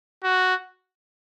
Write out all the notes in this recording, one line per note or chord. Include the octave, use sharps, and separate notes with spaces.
F#4